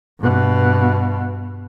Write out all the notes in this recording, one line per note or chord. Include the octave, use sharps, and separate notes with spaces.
G2 B2